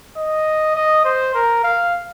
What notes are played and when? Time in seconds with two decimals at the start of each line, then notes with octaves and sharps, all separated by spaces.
0.17 D#5
0.76 D#5
1.05 C5
1.34 A#4
1.63 F5